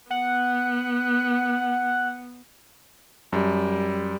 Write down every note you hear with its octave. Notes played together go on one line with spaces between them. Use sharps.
B3 F#5
F#2 G3